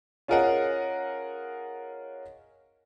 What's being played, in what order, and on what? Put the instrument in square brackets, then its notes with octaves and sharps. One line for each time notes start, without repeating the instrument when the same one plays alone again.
[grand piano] C#4 F4 G#4 A#4 D#5 F#5